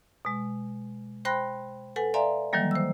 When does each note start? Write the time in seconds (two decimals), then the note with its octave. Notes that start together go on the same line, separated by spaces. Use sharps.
0.25 B2 G#3
1.25 C5 G5 B5 C6 F#6 A#6
1.96 A4 B4 F#5 G#5
2.14 D5 E5 F5 G#5 A#5 C6
2.53 D#3 E3 F#3 G3 A#3
2.71 C5 E6